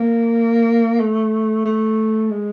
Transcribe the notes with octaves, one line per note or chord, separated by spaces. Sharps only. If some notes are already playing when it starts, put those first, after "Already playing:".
Already playing: A#3
A3
A3
G#3